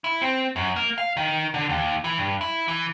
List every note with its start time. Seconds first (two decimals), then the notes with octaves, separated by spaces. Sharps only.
0.04 E4
0.22 C4
0.56 F#2
0.76 A#3
0.98 F5
1.17 D#3
1.54 D3
1.69 D#2
2.04 E3
2.18 G2
2.41 E4
2.68 E3